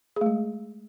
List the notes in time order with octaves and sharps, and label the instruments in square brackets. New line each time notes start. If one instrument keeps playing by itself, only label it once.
[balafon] G#4
A3
G#3